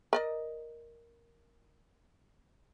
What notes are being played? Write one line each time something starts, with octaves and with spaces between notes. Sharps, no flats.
A#4 D5 D#5